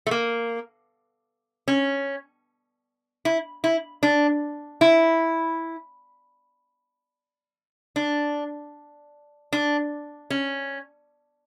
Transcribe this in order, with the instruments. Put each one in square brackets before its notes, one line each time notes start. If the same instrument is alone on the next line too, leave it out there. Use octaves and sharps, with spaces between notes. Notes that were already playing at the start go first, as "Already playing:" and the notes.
[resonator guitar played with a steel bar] A3
A#3
C#4
E4
E4
D4
E4
D4
D4
C#4